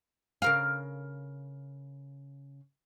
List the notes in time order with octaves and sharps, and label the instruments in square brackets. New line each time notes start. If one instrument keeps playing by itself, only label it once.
[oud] C#3 A#4 F5